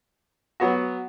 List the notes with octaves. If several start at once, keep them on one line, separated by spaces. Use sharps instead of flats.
F#3 B3 F#4